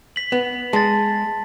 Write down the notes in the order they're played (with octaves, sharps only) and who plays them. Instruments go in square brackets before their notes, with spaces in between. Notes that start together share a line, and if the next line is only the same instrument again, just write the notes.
[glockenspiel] B6 F#7
[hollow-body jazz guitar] B3
[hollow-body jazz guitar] G#3 [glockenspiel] A5 A6